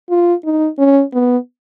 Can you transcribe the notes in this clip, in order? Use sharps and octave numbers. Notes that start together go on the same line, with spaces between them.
F4
D#4
C#4
B3